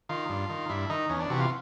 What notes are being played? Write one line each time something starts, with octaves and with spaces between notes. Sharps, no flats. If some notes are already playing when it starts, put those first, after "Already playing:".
D#3 F4
G2
D#3
G2 E4
D#3 D#4
E2 C#4
D4
C3 E3 F#4
F4